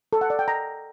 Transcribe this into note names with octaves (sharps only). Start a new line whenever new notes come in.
A4
F#5
D5
G5
A#5